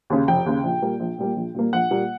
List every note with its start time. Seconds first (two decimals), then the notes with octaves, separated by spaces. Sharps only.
0.10 D#2 C#3
0.27 F1 G5
0.46 D#2 C#3
0.63 A#1
0.82 A#2 G3 A#3
1.00 A#1
1.19 A#2 G3 A#3
1.36 A#1
1.55 A#2 G3 A#3
1.73 A#1 F#5
1.91 A#2 G3 A#3